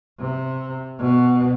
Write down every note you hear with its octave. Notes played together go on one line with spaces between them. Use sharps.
C3
B2